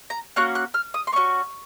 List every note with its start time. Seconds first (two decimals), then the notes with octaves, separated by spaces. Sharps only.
0.10 A#5
0.36 A#3 C#4 F#4 F#6
0.55 F#6
0.74 F6
0.94 D#6
1.07 C6
1.13 A#3 C#4 F#4 C#6